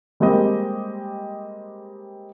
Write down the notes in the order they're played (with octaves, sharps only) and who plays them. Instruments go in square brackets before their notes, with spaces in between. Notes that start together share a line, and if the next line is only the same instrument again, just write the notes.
[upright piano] G3 G#3 A#3 C4 G4 D#5